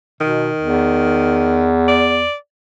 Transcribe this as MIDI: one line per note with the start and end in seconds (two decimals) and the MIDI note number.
0.21 0.50 47
0.21 1.77 51
0.61 2.24 40
1.88 2.35 74